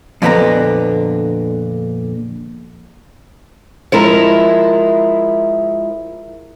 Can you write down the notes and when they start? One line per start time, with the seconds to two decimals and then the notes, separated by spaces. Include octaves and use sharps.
0.22 F2 A#2 D3 B3 D4 A#5
3.92 F3 G#3 E4 A#4